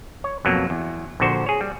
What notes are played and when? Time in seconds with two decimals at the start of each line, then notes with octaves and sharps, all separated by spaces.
0.24 C#5
0.45 F2 B2 F#3 A#3
0.70 E2
1.20 A#1 A#2 D3 F#4 C5
1.46 G#4 C#5
1.61 G3